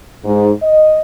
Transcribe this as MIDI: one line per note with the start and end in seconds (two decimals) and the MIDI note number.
0.24 0.50 44
0.62 1.01 75